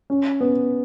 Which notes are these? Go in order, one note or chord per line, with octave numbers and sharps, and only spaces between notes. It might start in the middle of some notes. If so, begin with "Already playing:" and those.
C#4
B3